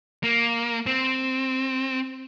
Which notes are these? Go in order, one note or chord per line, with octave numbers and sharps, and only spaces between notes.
A#3
C4